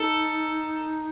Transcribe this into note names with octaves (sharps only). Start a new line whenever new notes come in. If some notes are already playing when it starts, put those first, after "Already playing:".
Already playing: D#4 A4